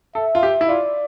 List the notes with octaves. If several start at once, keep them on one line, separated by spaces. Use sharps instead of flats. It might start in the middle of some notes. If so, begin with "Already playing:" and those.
A4 E5
F4
G4
E4
F4 D5